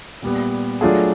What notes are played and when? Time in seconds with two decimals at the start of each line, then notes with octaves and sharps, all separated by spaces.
0.22 A#2 G3 B3
0.81 F#3 A3 D4 F4 G#4